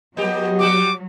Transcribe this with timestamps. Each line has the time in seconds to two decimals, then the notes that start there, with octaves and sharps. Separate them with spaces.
0.17 F#3 A#3 B3 G4 G#4 D#5
0.59 G3 F#4 G4 D6